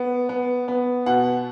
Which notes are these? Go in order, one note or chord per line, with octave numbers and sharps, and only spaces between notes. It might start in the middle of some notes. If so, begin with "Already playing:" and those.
Already playing: B3
B3
B3
B2 F#5